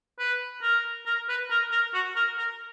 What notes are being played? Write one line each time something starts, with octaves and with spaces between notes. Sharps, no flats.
B4
A#4
A#4
B4
A#4
A#4
F#4
A#4
A#4